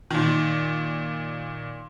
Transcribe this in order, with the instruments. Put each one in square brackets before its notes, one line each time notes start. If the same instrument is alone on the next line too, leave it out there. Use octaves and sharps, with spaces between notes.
[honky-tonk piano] A#2 D#3